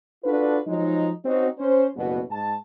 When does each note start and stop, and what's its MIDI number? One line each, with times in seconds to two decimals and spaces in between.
0.24 0.59 62
0.24 0.59 65
0.24 0.59 66
0.24 0.59 69
0.24 0.59 71
0.67 1.10 53
0.67 1.10 54
0.67 1.10 56
0.67 1.10 63
1.25 1.47 60
1.25 1.47 61
1.25 1.47 63
1.25 1.47 66
1.58 1.87 61
1.58 1.87 72
1.96 2.21 30
1.96 2.21 38
1.96 2.21 43
1.96 2.21 47
1.96 2.21 59
1.96 2.21 66
2.30 2.55 44
2.30 2.55 81